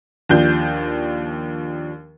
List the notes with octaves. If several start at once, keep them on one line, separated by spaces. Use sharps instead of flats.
D#2 F3 D4 G6